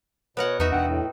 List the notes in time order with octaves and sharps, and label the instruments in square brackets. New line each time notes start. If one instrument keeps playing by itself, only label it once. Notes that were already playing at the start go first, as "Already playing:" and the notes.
[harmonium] B2 [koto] B3 A#4 F#5 [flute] C#5
[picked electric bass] E2 [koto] D#4 F#4 E5 [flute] B4
[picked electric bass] E2 D4 [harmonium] F#5 [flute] G5
[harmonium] A2